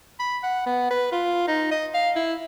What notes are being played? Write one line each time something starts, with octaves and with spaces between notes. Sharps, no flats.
B5
F#5
B3
B4
F4
D#4
D#5
F5
E4